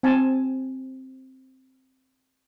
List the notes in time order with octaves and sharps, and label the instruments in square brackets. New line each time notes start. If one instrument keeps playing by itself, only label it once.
[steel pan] C4 G#5 A5